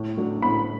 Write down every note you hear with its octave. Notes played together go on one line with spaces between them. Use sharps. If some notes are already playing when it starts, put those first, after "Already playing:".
Already playing: A2
F#3 A3 D4
A2 B5